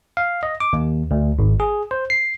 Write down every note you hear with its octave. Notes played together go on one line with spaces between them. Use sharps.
F5
D#5
D6
D#2
D2
G#1
G#4
C5
C7